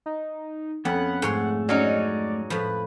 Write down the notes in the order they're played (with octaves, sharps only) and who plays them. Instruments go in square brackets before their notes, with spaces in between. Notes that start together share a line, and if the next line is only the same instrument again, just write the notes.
[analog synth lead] D#4
[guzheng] F2 [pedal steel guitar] B3 C#4 B4 [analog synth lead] F#5
[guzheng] G#2 C#5 C6 [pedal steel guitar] A3
[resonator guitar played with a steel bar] F#3 C#4 D#4 [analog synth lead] D5
[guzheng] A2 F3 [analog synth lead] B4